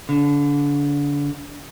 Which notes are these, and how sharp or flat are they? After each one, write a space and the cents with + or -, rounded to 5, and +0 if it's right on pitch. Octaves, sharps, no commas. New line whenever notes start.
D3 -30